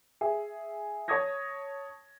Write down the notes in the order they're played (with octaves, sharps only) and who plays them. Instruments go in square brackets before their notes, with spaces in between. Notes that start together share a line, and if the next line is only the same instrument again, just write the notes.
[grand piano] G#4 E5
C#5 A5 C#6 D#6 G#6 A#6